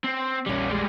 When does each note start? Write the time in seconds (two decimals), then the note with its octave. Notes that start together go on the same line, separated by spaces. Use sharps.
0.04 C4
0.46 A#1 E2 G3 C#4
0.69 G3 G#3